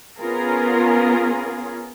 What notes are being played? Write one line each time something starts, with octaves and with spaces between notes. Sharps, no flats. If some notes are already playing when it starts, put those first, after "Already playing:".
B3 C#4 F4 G#4 A#4